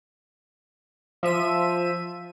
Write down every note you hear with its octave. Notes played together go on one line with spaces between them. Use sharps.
F3 E5 D#7